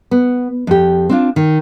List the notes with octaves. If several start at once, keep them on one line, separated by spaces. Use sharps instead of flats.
B3
F2 G4
C4 D4 F4
D#3